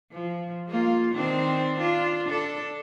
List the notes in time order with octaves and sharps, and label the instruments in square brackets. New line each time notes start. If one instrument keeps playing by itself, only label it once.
[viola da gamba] F3
G#3 A#3 F4
D#3 C4 D4
D4 F4
D4 A4